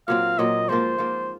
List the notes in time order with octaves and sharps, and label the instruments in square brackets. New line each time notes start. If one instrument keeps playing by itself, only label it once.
[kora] A#2 F#3 C4 [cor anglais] F5
[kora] A#2 F#3 C4 [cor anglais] D#5
[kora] G#2 F3 A#3 F4 [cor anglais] C5
[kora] G#2 F3 A#3 F4